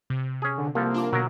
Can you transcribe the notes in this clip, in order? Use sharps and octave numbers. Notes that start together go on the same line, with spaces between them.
C3
C#4 G#4
D3
C2 F3 A#3 A4
D4 F4 D6
B2 D3 F#3 A#4